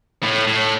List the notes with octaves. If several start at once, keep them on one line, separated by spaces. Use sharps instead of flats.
A2
A2